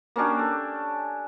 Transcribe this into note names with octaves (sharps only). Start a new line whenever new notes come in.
A#3 C#4 D4 G4
A4